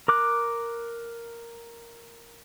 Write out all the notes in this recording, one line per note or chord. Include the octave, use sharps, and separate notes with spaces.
A#4 D6 F#6